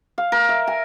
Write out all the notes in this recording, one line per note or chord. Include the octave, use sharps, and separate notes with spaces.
F5
A#4
E5
G#5